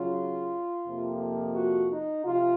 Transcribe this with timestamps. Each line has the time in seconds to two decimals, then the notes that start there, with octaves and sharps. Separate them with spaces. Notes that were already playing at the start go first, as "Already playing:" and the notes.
Already playing: C#3 F#3 C#4 F4
0.85 F2 C3 F3 A#3
1.55 F#4
1.91 D#4
2.25 C3 F3 F4